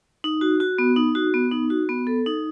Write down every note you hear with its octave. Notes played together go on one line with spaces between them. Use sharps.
D#4
F#4
F#4
B3
D#4
F#4
B3
D#4
F#4
B3
A4
D#4